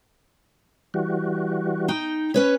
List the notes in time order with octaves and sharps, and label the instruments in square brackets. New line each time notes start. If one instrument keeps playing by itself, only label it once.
[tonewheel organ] E3 G3 F#4
[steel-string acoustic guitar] D#4 G5
C#4 B4 C#5